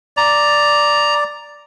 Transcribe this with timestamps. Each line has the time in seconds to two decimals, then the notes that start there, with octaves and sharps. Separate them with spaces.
0.17 D5 A#5